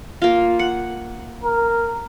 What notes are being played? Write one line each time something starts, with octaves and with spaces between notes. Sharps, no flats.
A#3 F4
F#5
A#4